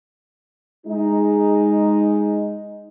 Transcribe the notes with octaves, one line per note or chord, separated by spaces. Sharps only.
G#3 D#4